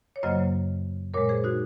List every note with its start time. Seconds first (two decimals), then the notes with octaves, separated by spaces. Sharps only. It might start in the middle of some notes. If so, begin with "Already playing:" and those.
0.16 C#5
0.23 F#2 C#3 F#3 A#3 C5 D#5
1.14 A#2 G#3 A#4 C#5
1.29 G#4 C5
1.44 D#4 F#4